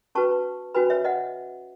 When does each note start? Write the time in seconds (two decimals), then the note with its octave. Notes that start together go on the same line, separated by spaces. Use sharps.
0.15 C#4 F#4 B4 A5 C#6
0.75 C#4 F#4 B4 G#5 B5
0.90 C#5 E5
1.05 D#5 F#5